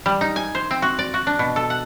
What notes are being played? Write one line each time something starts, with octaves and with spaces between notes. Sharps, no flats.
G3
D#4
G#5
C5
C4
F#4
D5
F#4
D4
B2
A4
F#5